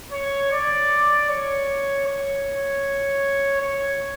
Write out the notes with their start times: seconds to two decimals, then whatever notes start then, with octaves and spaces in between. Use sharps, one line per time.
0.12 C#5
0.52 D5
1.29 C#5
2.06 C#5
3.61 C#5